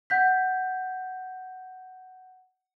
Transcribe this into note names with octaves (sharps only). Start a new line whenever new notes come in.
F#5 G6 B6